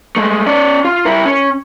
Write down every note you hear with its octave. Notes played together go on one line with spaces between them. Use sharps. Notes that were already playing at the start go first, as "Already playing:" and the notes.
G#3 A3
C#4 D5
F4
E4 A#4
C#4